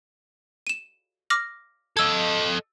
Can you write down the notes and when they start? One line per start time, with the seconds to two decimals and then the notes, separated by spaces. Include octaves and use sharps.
0.67 D#7 E7
1.30 D6 F6 A#6
1.97 A4 D#5 E6 G#6